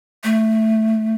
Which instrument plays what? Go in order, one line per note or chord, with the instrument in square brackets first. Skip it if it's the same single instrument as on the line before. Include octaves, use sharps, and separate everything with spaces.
[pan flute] A3